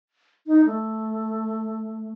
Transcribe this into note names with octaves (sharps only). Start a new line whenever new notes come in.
D#4
A3